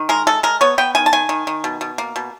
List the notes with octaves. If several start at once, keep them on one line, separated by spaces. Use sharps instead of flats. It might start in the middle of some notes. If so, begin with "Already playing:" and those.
Already playing: D#3
G#3 A#4
G#3 A4
G#3 A#4
B3 C#5
B3 G5
D#3 G#5
A5
D#3 G#5
D#3
D#3
B2
B2
A#3
B2